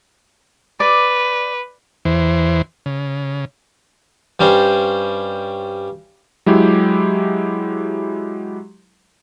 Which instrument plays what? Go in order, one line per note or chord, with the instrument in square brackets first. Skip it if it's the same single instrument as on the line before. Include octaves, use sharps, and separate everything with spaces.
[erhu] B4 [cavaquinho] D5
[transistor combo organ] E2 E3 C5
C#3
[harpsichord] G2 G3 C#4 C5
[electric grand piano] F#3 G#3 E4 G4